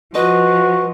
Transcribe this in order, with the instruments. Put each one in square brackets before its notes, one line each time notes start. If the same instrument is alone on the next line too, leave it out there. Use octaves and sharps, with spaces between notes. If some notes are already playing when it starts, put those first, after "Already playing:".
[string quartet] F3 [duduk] F#4 [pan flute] B4 [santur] D#5